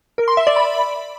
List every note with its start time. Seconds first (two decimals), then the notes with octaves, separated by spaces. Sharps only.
0.18 A#4
0.28 C6
0.37 E5
0.47 D5
0.56 B5